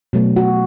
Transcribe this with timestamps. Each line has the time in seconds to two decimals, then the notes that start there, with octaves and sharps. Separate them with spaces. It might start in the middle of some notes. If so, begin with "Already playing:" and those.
0.13 B2 F#3 A3
0.36 F#4